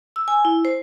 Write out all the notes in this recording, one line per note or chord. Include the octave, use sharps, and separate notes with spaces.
E6
G#5
E4
C5